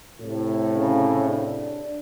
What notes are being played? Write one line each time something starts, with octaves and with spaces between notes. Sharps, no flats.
A2 C3
C#3
D4